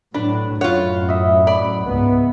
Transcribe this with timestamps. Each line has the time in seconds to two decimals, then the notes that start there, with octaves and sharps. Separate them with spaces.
0.14 A2 F#3 D4 B4
0.61 F#2 A2 F4 C#5 F#5
1.08 D#5 E5
1.47 D5 B5
1.86 C#2 G#2 B3